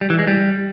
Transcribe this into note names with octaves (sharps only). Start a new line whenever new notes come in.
G3
E3
G#3
G3